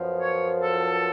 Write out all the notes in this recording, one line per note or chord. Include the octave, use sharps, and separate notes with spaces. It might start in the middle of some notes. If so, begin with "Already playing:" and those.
Already playing: F#2 F3 B3
C#5
A4